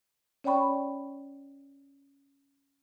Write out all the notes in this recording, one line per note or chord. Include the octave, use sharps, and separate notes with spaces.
C#4 C#5 D5 G5 B5 C#6